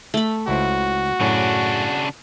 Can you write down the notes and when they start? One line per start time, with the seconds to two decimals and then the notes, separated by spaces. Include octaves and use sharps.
0.14 A3 B5
0.48 C#2 E4 F#4 C5
1.20 F#2 A2 C#3 D4 C#5